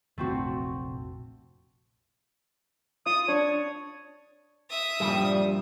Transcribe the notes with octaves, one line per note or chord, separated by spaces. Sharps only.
F1 A#1 A3 C4 F#4
F4 D#6
D4 C#5
E5 D#6
G2 A#2 F3 G3